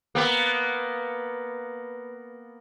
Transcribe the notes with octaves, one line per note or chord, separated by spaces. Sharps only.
A#3 B3